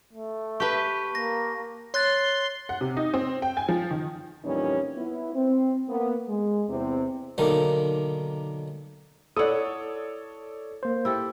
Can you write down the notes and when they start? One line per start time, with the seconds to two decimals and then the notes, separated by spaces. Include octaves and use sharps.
0.13 A3
0.60 G4 B4 A5 C#6
1.15 A#3 A#6
1.94 C#5 C6 F#6 A6
2.69 F#5
2.81 C3
2.97 D#4
3.14 C4
3.42 G5
3.57 G#5
3.69 F3
3.91 D#3
4.44 F2 A#2 E3 G3 C#4 D#4
4.97 B3 E4
5.34 C4
5.89 A#3 B3
6.28 G#3
6.69 E2 C3 C4
7.38 B1 D3 D#3 A#3
9.37 E4 A4 C#5 D5 F#5 D#6
10.83 A#3 C5
11.05 E4 G4 A4